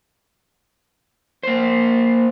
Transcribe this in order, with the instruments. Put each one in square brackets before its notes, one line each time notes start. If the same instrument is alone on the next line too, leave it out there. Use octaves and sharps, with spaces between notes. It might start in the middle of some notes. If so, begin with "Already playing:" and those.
[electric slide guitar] A#3 C5